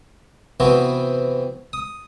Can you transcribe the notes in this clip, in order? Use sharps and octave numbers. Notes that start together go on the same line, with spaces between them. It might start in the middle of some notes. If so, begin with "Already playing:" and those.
C3 E3 B3 C4 F#4
D#6